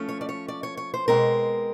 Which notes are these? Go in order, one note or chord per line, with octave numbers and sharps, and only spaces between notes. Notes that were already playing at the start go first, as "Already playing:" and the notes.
Already playing: F3 A3 C#4
C#5
D5
C#5
D5
C#5
C#5
C5
B2 G#3 C4 A#4